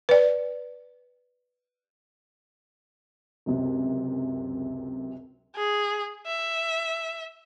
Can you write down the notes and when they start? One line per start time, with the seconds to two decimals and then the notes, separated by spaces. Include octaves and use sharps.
0.09 B4 D5
3.46 C#2 F#2 C3
5.56 G#4
6.27 E5